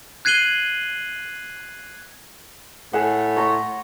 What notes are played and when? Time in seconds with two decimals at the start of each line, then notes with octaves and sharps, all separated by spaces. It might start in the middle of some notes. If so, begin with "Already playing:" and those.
0.25 F#6 G#6 C7 D#7 F#7 G7
2.93 A2 F#5 G#5
3.37 C#5 A#5 C6